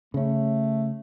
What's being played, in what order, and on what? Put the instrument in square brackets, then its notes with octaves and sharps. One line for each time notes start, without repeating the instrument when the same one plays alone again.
[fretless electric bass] C#3 C#4 [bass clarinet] A3